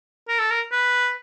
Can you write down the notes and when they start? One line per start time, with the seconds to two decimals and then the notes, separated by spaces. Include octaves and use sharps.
0.28 A#4
0.39 A4
0.50 A#4
0.72 B4